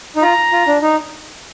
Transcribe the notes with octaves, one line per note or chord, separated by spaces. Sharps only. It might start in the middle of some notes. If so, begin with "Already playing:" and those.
D#4
F4 A#5
F4
D4
D#4